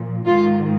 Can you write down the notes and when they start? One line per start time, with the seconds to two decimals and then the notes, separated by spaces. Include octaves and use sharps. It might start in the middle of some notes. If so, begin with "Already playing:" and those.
Already playing: A#2 F3
0.25 G#2 D#3 F4